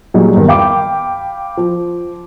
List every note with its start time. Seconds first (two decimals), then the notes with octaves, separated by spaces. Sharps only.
0.14 A#2 F#3 G3 D#4 G#4
0.36 E2 G2 D#3
0.48 F5 G5 B5 D6
1.57 F3